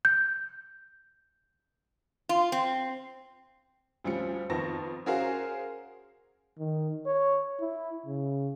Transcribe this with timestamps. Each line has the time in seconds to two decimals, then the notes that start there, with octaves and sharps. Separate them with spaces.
0.05 G6
2.29 F4
2.52 C4
4.04 D2 F3 G3 C#4 C#7
4.50 F2 D#3 B3 A5 C#6 A#6
5.06 C#4 F#4 G#4 A#4 C5 F5
6.59 D#3
7.06 C#5
7.61 E4
8.06 C#3